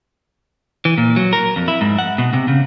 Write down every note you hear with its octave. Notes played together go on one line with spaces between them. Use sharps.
E3
A#2
F#3
A#4
F2
E4
G#2
F#5
B2
C3
C#3